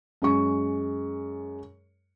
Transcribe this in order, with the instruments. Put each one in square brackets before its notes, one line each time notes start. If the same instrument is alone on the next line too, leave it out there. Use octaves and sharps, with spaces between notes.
[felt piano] F#2 G#3 C#6